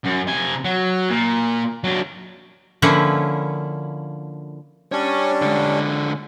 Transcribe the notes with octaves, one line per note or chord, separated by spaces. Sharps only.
F#2
C3 G#5
F#3
A#2
F#3 D4
D3 F3 A#3 C#4 E4 B4
G3 C#4 D4 C#5 G#5
D3 G#3